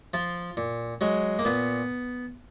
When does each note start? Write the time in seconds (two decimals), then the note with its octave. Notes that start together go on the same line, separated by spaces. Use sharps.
0.14 F3 F4
0.57 A#2
1.01 F#3 G#3
1.39 A#3
1.45 A#2 B3